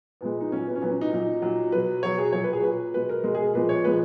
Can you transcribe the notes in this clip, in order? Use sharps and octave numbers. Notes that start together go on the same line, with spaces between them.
A#2 G#3 B3
D#4
A#2 F#3 C#4
B3
C#4
A#2 F#3 B3
C#4
D#4
A#2 F#3 D#4
A#2 F#3
B2 F#3 B4
B2 F#3 C#5
G#4
A#2 F#3 C#5
B4
G#4
A#2 F#3 B4
B2 G#3 B4
A#4
B2 G#3 A#4
G#4
A#4
A#2 F3 G#3 B4
C#5
A#2 F3 G#3 B4